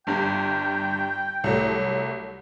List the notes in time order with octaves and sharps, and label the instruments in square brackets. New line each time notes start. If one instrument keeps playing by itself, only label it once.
[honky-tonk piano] G1 G2 [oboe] G5
[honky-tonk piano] C2 F#3 A3